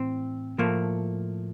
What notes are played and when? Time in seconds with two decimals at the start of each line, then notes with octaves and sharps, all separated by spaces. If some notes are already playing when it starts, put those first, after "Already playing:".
Already playing: A2 E3 C4
0.58 A2 F3 A3 A#3